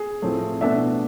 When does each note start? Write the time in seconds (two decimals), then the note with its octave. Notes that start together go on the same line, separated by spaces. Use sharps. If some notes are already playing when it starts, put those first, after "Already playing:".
Already playing: G#4
0.22 A2 F3 A3 C4
0.61 B2 A3 D4 E5